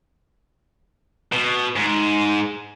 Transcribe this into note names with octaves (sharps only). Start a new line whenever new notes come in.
B2
G#2